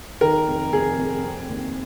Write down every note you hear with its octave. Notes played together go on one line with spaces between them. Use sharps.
D#3 A#4
F1
F1 G#4
F1
C4
D#2